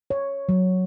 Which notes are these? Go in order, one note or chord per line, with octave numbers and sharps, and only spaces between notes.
C#5
F#3